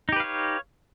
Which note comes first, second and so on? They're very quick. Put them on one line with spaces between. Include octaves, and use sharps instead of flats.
D#4 G4 B4 F5 C#5